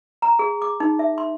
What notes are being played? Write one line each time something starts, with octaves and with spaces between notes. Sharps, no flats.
A#5
G#4
D6
D#4
E5
C6